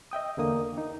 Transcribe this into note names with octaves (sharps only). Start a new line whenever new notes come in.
D#5 E5 G5 D#6
E2 D3 A#3 D#6
D#4